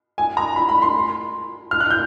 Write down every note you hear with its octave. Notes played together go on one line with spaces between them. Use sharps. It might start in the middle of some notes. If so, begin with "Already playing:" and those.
G#5
A#5
B5
B5
C6
F6
F#6
G6